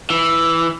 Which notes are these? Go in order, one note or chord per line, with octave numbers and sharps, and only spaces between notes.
E3